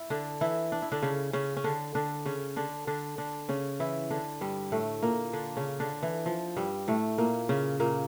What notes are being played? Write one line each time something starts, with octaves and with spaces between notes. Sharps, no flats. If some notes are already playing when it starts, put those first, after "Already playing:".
Already playing: E4
D3 D4
E3 E4
D4
E4
D3 D4
C#3 C#4
C#3 C#4
C#4
D3 D4
D3 D4
C#3 C#4
D3 D4
D3 D4
D3 D4
C#3 C#4
E3 E4
D3 D4
G2 G3
A2 A3
A#2 A#3
D3 D4
C#3 C#4
D3 D4
E3
F3
G2 G3
A2 A3
A#2 A#3
C#3 C#4
A#2 A#3